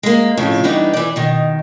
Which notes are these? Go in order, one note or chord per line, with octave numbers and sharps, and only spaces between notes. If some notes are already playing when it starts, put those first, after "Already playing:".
G#3 A#3
F2 A2 C#3
E3 G3 B3 D4 D#4
E3 D5
B2 D#3